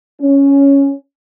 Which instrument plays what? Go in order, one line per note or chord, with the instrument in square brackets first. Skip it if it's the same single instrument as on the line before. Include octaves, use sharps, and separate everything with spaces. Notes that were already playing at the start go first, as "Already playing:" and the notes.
[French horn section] C#4